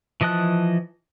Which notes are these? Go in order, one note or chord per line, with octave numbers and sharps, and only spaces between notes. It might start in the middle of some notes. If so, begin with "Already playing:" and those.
E3 F3 D#5 A5 F#6